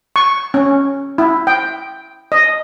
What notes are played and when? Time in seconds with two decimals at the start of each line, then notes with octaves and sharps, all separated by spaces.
0.16 C#6
0.54 C#4
1.18 E4
1.47 G5
2.32 D#5